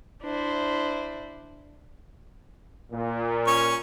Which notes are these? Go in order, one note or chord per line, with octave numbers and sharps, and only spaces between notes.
D4 E4 C5
A#2
C#4 C#6